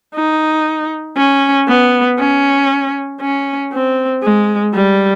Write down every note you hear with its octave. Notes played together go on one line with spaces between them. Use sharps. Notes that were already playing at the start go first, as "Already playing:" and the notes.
D#4
C#4
B3
C#4
C#4
C4
G#3
G3